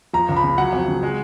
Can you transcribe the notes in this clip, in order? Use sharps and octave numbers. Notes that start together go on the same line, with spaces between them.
F3 A#5
C#2
B5
C#3
F#3 F#5
F2
C#3
G#3